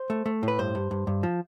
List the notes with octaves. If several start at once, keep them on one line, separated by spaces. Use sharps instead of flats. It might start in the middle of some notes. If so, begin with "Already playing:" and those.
Already playing: C5
A3
A3
A2
B4
G2 C5
G2
G2
G2
F3